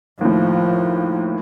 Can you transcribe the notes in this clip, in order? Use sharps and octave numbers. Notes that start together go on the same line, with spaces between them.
D#2 A2 F3